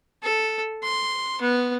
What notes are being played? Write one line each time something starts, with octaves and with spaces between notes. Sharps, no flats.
A4
C6
B3